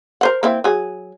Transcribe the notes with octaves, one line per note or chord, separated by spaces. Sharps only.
A#4 C5 F#5
A#3 C4 E4
F#3 G#4